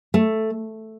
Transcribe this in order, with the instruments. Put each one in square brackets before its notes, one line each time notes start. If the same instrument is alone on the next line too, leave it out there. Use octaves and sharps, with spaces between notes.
[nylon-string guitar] A3